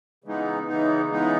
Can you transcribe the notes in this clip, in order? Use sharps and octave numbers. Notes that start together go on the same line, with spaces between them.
C#3 E3 G#3 B3 D#4
C#3 E3 G#3 B3 D#4
C#3 E3 G#3 B3 D#4